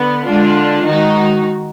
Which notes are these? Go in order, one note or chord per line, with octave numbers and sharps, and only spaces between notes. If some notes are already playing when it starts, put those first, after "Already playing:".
Already playing: D3 B3
D3 G#3 D4 F4
D#3 G#3 D#4 F#4